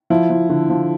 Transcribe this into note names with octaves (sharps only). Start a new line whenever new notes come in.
F3 E4
F3
D3
F3